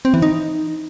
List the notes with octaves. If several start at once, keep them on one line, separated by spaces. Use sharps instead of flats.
C4
E3
D#4